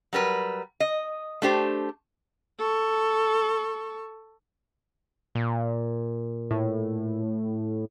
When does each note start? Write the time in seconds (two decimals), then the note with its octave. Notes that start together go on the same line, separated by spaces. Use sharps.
0.13 F#3 G3 A#4 B4
0.80 D#5
1.42 A3 D4 G4 C5
2.59 A4 C#6
5.35 A#2
6.51 A2